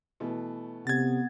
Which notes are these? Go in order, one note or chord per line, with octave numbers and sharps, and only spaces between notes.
B2 E3 A3
C3 B3 G#6 A6